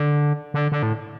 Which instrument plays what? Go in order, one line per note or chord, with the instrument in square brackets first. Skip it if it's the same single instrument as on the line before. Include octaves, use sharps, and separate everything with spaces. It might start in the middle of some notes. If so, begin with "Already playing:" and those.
Already playing: [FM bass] D3
D3
D3
A2